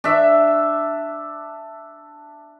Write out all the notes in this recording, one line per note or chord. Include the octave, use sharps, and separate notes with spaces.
D4 E5